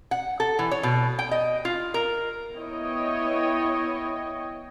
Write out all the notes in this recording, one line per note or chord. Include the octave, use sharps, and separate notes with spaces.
F#5
A4
E3
C#5
B2
G5
D#5
F4
A#4
B3 E4 C#5 D#5 G5